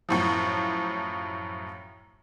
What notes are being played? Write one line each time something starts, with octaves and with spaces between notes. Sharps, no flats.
F#2 A2 F3